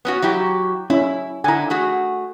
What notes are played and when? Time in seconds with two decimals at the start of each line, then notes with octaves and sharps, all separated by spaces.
0.05 B3 C#4 F#4
0.22 F#3 E4 G4
0.90 C#4 E4 E5
1.44 D3 E4 G#5 A#5
1.70 A3 F#4 G#4